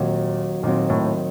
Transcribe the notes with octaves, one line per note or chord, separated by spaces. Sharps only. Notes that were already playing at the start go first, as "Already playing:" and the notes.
Already playing: D#2 A#2 D#3 F#3 C4
D#2 A#2 D#3 F#3 C4
A2